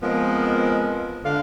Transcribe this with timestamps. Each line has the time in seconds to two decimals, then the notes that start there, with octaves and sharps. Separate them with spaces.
0.03 F3 G#3 B3 C4 A#4 D#5
1.24 D3 F5